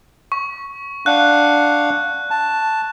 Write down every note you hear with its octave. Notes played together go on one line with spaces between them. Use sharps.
C#6
D4 F5 F#5 F#6
A5